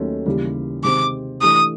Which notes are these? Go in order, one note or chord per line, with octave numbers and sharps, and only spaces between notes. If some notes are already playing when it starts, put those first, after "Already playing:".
Already playing: D#2 D#3 F#3 A3 C#4
D#2 C#3 E3 G3
C3 D#3 G#3 C4 D6
E3 A3 D4 G4 D#6